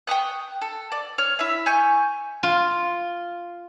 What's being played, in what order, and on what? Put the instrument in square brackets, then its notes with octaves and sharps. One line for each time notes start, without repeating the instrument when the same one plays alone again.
[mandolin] G5 C#6 D#6 F#6
A4
D5
C#5 F6
E4 E5
G#5 C#6 G6
[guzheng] F4